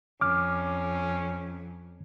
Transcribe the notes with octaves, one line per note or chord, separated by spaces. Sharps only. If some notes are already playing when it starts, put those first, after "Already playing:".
F2 C#4 D6 F6